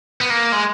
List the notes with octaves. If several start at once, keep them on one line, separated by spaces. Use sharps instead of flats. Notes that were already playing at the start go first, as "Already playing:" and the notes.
B3
A#3
G#3